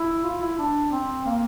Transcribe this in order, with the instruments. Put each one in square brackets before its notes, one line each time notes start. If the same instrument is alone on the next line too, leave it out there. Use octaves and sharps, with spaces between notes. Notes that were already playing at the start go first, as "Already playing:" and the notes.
Already playing: [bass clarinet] E4
F4
E4
D4
C4
A#3